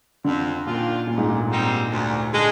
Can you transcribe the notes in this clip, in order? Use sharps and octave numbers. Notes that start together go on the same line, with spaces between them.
F2 D3
A#2 D#3 A#3 D4 F4
D2 A#2
G#2
A#2
C3 G3 C4 D#4
D2
D3 G#3